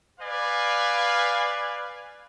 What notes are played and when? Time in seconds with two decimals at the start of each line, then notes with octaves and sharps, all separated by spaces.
0.20 B4 D5 F5 G#5